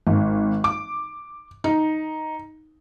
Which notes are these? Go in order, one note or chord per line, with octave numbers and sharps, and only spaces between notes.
G#1
D6
D#4